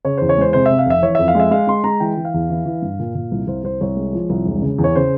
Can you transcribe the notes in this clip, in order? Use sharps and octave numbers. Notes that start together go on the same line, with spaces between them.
C#3 C#5
E2 C5
C#5
G#3 C5
C3 C5
C3 E5
F5
F1 E5
E3 C#5
F2 E5
F5
G#3 E5
G#3 F5
G#3 C6
G#3 A#5
E3 G5
E3
F5
E2
E3
E3
G2
A#2
A#2
C2
C2 C5
C2 C5
C2 C#5
G#3
F3
C2
E1
C#3
E2
C#5
C#3 C5